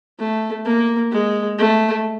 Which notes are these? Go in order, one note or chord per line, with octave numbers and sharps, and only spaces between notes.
A3
A#3
G#3
A3